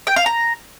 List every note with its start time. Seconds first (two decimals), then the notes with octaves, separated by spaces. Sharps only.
0.07 G5
0.16 F5
0.26 A#5